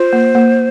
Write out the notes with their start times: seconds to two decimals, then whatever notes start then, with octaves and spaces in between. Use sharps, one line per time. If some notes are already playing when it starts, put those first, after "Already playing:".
Already playing: F4 C5
0.13 A#3
0.35 A#3